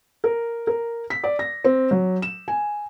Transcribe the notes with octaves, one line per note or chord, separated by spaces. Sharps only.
A#4
A#4
B6
D5
A#6
C4
F#3
E7
G#5